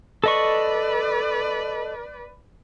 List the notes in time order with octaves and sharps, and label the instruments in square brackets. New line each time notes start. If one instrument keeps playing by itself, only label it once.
[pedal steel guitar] A4 D#5 C#6 [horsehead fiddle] B4 D5